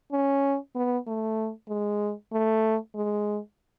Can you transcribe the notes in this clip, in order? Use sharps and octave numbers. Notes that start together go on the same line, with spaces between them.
C#4
B3
A3
G#3
A3
G#3